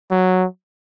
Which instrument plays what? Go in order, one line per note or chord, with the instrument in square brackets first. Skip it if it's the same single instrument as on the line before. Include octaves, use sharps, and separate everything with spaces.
[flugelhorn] F#3